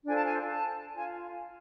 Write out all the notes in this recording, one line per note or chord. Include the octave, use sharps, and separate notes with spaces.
D4 F4 A4 C5 G#5
A5
G#5
A5
F4 G#5